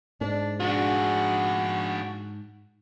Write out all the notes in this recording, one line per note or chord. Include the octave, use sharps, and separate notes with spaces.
G#2 D4
D4 F#4 G#4